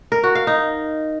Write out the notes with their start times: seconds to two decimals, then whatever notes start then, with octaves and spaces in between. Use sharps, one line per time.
0.12 A#4
0.24 F#4
0.35 F5
0.47 D#4